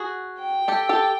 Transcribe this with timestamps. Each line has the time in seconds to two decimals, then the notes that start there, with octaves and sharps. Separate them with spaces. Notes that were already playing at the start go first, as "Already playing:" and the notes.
Already playing: F#4 G#4
0.40 G5
0.68 G4 A4
0.89 G4 A4